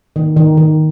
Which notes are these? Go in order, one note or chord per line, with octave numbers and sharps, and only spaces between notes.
D#3
D#3
D#3